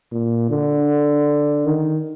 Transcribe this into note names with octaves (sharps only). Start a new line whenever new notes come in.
A#2
D3
D#3